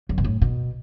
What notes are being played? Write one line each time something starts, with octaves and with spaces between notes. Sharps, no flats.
F#2
B2
A2
B2